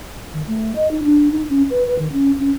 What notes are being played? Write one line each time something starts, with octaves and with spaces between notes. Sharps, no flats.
D#3
A3
D#5
D#4
D4
D#4
C#4
B4
B4
D#3
C#4
C#4